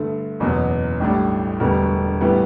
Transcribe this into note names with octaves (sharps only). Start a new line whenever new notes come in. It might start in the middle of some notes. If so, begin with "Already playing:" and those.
Already playing: G2 D3 A3
F#1 E2 B2 F#3 B3
A1 A2 G3 D4
E1 D2 D3 G3 B3
A2 E3 G3 B3